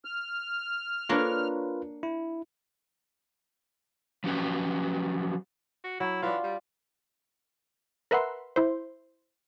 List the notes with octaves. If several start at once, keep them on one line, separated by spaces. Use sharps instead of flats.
F6
A#3 D4 F4 A#4 B4 C#5
E4
F3 F#3 C#4 G4 B4
F#4
F#3 E4
E3 D4 F4
G3
A#4 B4 E5 F#5 C6
E4 C5